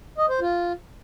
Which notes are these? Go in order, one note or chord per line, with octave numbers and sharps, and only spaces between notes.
D#5
C5
F4